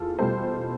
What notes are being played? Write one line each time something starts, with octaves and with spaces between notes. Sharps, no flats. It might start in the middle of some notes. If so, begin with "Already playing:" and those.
Already playing: E2 F4 A4
B2 G3 A4 C5